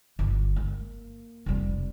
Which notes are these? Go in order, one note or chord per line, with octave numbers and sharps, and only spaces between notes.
G1
A#3
F1 G3